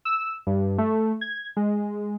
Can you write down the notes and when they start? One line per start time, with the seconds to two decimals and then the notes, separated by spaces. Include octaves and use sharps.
0.05 E6
0.47 G2
0.78 A3
1.21 G#6
1.57 G#3